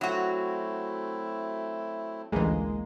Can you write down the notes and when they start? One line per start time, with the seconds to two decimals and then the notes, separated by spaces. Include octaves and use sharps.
0.01 F#3 A3 C4 E4 F#4
2.32 A1 D2 E3 G#3 A#3